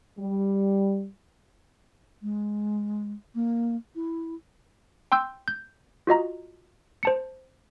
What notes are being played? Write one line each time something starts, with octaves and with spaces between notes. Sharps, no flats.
G3
G#3
A#3
E4
G5 C6 E6 G6
G6
F4 F#4 D#5 A#5
C5 A5 C#7